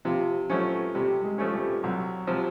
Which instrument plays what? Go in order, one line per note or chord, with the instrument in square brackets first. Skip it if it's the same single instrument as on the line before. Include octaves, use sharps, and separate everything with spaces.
[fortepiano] C3 [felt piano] F3 F4
[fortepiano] F3 A3 C#4 [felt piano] F#3 F#4
[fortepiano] C3 [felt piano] G3 G4
[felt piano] G#3 G#4
[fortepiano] F3 A3 C#4
[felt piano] G3 G4
[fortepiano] C2 [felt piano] F#3 F#4
[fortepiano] C3 F3